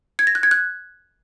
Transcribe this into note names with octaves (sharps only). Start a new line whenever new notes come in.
G#6
A#6
F#6
G#6
F#6